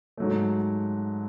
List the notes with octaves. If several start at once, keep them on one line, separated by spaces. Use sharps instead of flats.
G#2 F#3 A3